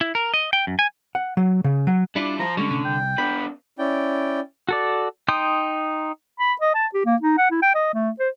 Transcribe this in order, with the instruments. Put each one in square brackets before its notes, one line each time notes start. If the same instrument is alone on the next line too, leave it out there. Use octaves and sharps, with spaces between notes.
[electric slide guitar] E4
A#4
D#5
G5
F#2
G#5
[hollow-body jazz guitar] F#5
F#3
C#3
F#3
[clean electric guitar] G3 E4 F4 [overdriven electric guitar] D4
[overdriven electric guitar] F3 C5 [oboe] A#5
[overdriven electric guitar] D3 [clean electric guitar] G3 G#3 C#4 [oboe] C#6
[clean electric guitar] A2 C3 C#4
[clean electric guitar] C2 [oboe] G5
[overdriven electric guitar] B3 D4 [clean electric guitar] B5
[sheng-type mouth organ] C#4 E4 D5 G5
[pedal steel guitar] F#4 A4 D5
D#4 G5 C6 D#6 G6
[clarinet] B5
D#5
A5
G4
A#3
D#4
F#5
E4
G5
D#5
A3
C5